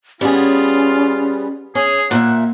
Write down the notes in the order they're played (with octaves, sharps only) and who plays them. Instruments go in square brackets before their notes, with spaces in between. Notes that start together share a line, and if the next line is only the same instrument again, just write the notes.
[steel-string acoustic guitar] G3 B3 G#4 [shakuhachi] C#4 [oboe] F4
[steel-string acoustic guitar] C#4 [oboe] G#4
[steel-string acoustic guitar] A#2 A#4 E5 [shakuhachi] A#3 [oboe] F#5